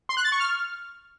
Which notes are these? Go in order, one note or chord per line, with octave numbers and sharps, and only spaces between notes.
C6
F#6
A6
C#6
F6